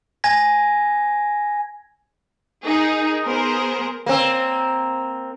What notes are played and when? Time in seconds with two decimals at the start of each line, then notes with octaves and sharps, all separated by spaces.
0.24 G#5 G#6 A#6
2.66 D#4 G#4 A#4
3.24 B3 G#4 A#4 C5
4.06 A#3 C4